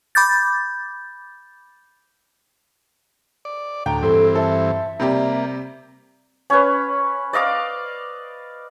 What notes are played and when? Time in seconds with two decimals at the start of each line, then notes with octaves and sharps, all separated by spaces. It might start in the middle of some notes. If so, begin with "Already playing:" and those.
0.15 B5 D6 G6 A6
3.45 D5
3.86 D2 A2 G5 A#5
4.03 G2 E3 C4 A4
4.35 A4 E5
5.00 C3 G3 A#3 G4
6.50 C#4 B4
7.33 D5 D#5 F5 D6